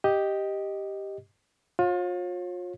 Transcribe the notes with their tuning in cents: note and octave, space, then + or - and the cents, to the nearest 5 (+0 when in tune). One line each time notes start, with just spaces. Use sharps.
G4 +0 D#5 +0
F4 +35 C#5 -35